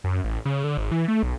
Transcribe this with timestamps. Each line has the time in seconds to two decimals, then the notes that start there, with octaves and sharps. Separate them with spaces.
0.04 F#2
0.24 A1
0.45 C#3
0.64 D3
0.77 G#1
0.91 E3
1.08 A3
1.23 B1